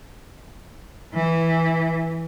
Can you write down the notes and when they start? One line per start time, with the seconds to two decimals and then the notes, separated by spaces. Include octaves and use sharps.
1.14 E3